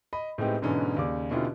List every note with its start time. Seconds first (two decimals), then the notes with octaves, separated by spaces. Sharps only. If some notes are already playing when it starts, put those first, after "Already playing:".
0.13 D#5 B5
0.38 A2 G#3 B3 C4 D#4 G4
0.62 G#2 B2 D3 E3 C#4 D4
0.97 D#2 C#3 D5 D6
1.31 B2 D3 C#4 E4 F4 G4